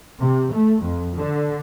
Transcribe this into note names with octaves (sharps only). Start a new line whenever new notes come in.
C3
A3
F2
D3